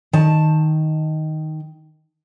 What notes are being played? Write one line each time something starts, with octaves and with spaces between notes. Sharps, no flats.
D#3 A5